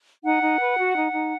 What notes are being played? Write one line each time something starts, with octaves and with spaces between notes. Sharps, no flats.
D#4 F#5
D#4
B4
F#4
D#4
D#4